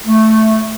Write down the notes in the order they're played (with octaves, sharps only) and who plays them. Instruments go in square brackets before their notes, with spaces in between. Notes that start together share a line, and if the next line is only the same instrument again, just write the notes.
[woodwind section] A3